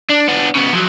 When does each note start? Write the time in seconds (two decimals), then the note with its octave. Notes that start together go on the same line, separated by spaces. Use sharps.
0.10 D4
0.28 B3 D4
0.55 C#3 B3
0.73 F3 F#3